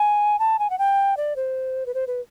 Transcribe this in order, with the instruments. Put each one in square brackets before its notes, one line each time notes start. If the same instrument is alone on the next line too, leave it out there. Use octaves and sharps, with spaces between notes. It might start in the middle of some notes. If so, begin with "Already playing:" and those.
Already playing: [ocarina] G#5
A5
G#5
F#5
G5
D5
C5
B4
C5
B4